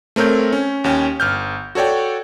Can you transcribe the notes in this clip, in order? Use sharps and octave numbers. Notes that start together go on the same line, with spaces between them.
A3 C4 A#4 C#5 G6
C#4
D#2 C#4 G5
G1 F6 G6
F#4 A4 C#5 D5 G5